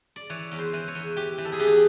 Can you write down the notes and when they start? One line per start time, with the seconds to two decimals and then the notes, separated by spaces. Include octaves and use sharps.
0.16 D5
0.30 E3 C#5
0.52 E2
0.59 C5
0.73 E3
0.88 C#5
0.95 E2
1.16 E3 G4
1.38 E3
1.45 A4
1.52 G#4
1.59 E2 G4
1.66 G#4